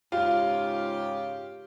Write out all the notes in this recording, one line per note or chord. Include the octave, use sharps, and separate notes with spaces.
G#2 C#3 F4 G4